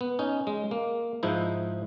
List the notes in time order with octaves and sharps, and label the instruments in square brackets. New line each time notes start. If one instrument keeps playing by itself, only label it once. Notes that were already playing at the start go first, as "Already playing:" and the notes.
[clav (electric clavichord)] B3
C#4 D#4
G#3
A#3
G#2 F3 D#4 E4